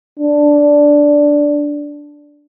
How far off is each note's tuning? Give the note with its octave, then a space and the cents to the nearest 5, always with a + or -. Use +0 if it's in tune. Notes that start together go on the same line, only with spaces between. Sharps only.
D4 -5